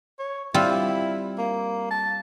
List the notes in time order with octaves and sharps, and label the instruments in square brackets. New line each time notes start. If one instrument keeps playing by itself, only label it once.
[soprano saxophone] C#5
[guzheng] G3 C4 F4 [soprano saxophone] E4
[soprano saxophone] A#3
A5